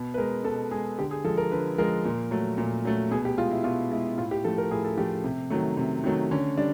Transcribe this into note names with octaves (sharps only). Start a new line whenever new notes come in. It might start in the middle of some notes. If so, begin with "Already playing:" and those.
Already playing: B2
B4
G#3 A#4
B2 A4
G#3 G#4
D3 G4
G#4
F3 G#3 A4
A#4
D3 B4
F3 G#3 A#4
A#2
F#3 A3
A#2
F#3 A3
B2 G#4
G4
G#3 F4
E4
B2 F4
G#3 E4
A2 F4
G4
F3 A3 A4
A#4
A2 G#4
A4
F3 A3 G4
C3
D#3 F#3 A3
C3
D#3 F#3 A3
D3 C#4
G3 D4